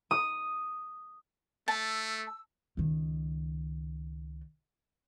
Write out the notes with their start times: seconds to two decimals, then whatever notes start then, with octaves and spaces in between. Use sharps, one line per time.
0.11 D#6
1.68 A3 A5 E6
2.77 C#2 D#3